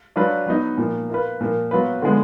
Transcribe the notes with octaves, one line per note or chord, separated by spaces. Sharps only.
F#3 D4 F4 B4
F#3 B3 D#4
A#2 F3 A#3
A#3 F4 B4
A#2 F3 A#3
F#3 B3 F4 B4
D3 F3 G#3 B3